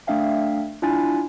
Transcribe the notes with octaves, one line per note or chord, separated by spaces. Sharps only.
A3 D4 E5 F5 G5
D4 E4 F4 G#5 A6